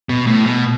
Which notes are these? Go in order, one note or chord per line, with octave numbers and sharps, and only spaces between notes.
B2
A2
B2